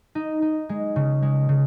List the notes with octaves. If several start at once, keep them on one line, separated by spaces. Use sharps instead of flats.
D#4
D#4
G#3
C#3
G#3
C#3